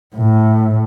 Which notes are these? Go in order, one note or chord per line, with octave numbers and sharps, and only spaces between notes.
A2